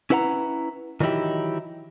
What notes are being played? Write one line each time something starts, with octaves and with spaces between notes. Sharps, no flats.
C#4 E4 B4 F#5 G5 A#5
D#3 E3 F#3 D#4 E4 G4